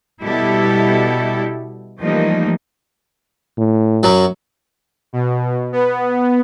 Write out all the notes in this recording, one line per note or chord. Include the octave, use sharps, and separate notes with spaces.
B2 G3 E4 G4 A4
E3 F3 G3 A3 A#3 D#4
A2
F#2 F#3
B2
B3